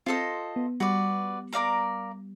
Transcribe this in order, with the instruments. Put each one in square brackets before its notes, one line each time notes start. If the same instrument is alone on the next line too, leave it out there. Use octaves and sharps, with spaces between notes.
[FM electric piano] C4 [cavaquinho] F4 A4 C5 D#5
[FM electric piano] B3
[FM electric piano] G3 [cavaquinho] F#4 B4 D5
[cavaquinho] A#4 D5 F5 A#5